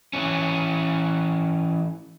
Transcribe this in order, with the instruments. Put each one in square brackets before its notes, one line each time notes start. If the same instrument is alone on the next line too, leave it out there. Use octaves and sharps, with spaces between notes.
[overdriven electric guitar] E3 C#4